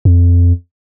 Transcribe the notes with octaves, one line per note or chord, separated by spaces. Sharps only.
F2